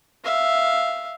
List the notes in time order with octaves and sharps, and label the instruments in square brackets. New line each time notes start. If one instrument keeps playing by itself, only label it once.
[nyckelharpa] E5 F5